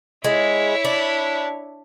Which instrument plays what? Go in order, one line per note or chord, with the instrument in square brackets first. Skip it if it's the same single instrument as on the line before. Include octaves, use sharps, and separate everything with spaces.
[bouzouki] G#3 [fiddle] E4 C#5
[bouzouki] D4